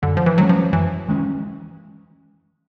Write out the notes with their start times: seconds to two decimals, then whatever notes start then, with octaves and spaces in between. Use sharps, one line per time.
0.03 F#2 D3
0.17 F3
0.26 E3
0.38 D#3 F#3 G#3 C#4
0.49 F3
0.73 F#2 E3
1.08 D#3 G#3 C#4